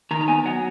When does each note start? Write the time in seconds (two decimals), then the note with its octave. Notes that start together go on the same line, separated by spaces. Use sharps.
0.11 D#3 A#5
0.21 A#5
0.28 B3 G#5
0.45 F#3 F#5